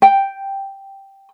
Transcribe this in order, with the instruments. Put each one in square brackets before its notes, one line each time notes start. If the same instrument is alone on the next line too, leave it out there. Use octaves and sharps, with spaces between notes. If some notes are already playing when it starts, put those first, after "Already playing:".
[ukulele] G5